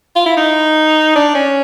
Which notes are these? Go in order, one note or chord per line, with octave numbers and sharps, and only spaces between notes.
F4
E4
D#4
D4
C#4